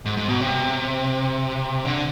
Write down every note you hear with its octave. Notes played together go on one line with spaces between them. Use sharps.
G#2
G#2
B2
C3
D3